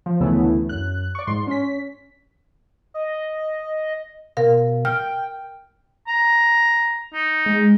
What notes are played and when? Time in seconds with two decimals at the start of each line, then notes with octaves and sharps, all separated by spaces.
0.06 F3
0.20 D2 C#3 E3 A3 B3 E4
0.69 F#2 F#6
1.15 D5 C#6
1.27 G#2 C6
1.47 C#4 B6
2.94 D#5
4.37 B2 A#4 F5
4.85 G5 F6
6.08 A#5
7.13 D#4
7.46 G#3